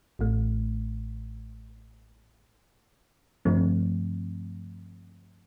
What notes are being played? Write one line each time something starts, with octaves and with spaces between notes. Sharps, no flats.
A1 A2 A3
G2 D3 F3 A3 C4